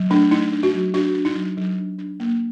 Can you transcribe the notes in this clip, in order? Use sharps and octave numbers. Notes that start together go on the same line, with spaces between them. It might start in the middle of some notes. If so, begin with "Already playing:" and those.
Already playing: F#3
A3 D4
A3 D#4
D4
F#4
F#3
D4 F#4
D4
D#4
F#3
F#3
D4
D4
A#3